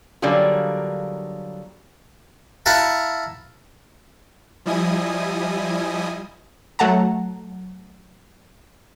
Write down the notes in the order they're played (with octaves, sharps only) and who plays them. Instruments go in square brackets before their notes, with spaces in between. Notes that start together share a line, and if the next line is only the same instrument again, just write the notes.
[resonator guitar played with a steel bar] D3 F#3 G3 A#3 F4 G#4
[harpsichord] E4 F5 F#5 A5 A#5
[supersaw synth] F3 G3 E4 D#5 G#5 D#6
[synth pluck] F#3 A3 F#5 A5 A#5